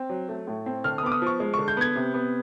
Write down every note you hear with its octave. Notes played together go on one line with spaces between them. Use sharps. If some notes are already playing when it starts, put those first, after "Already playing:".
Already playing: C4
F#3
A3
A2
C4
D3 F6
D#6
B3 D6
D#6
F3 C#6
G#3
D3 C#6
G6
B3 G#6
C3
B3